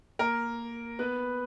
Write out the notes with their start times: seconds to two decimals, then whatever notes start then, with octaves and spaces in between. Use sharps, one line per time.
0.19 A#3 A#4
0.99 B3 B4